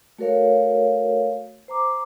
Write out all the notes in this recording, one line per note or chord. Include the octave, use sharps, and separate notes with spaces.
A3 F#4 A4 A#4 C#5 F5
C5 A#5 D6